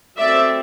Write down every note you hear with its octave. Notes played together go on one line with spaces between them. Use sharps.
F#3 A3 C4 D5 E5